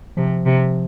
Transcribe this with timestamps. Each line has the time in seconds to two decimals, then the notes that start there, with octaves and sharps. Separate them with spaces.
0.17 C3 F3
0.46 C3